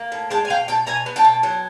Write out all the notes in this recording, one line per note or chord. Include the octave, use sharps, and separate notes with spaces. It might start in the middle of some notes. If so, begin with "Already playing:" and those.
Already playing: A#3
A2
G#3 G5 A5
G#5
B2 F5 G5
B2 G5 A5
B2 G#5 A#5
B3
G5 A5
B2
F#3